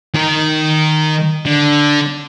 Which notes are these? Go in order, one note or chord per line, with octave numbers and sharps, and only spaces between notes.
D#3 A#4
D3